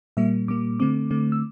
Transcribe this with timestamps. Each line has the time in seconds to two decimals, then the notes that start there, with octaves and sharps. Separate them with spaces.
0.17 A#2 G3 A#3 E5
0.48 A#2 G3 A#3 D6
0.80 D3 A3 C4 D6
1.11 D3 A3 C4
1.32 E6